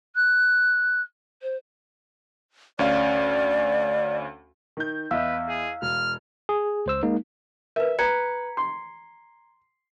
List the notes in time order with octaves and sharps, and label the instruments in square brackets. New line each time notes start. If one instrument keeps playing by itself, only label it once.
[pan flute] F#6
C5
[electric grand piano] D2 C#4 F5 [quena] D5
[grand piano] D#3 G6
[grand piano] E2 E4 D#5 [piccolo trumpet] B4 [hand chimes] F5 E6
[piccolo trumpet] G#4
[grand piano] E1 [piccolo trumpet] F6
[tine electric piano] G#4
C#2 C5 E6
G#3 A#3 D#4
[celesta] A#4 B4 [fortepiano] E5
[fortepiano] B4 [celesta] A#5 G#6 C#7
[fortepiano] C6